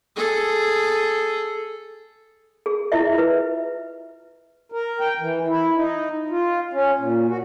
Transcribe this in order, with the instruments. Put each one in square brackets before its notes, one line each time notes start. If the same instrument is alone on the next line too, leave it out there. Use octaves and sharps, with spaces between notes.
[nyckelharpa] G#4 A4
[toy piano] G#4
E4 F4 D#5 E5
F4 B4
[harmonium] A#4
G5
E3
E4
D#4
F4
C#4
A#2
F#4